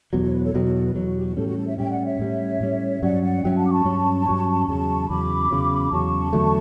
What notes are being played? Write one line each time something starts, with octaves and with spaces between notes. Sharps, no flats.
E2 B2 F#3 G4
A4
C#5
B4
A4 C#5
E2 B2 F#3 G4
A4
A4
B4
E2 B2 F#3 A4
F#4
G4
F#4
A2 G3 C#4 A4
F#4
A4
C#5 E5
A2 G3 C#4 E5 G5
D5 F#5
C#5 E5
A2 G3 C#4
A2 G3 C#4
G2 F#3 C#4 D5 F#5
D5 F#5
G2 F#3 C#4 E5 G5
F#5 A5
D6
A5 C#6
G2 F#3 C#4
G2 F#3 C#4
E2 C#3 F#3 A5 C#6
E2 C#3 F#3 B5 D6
E2 C#3 F#3
E2 C#3 F#3 A5 C#6
E2 D3 F#3 A3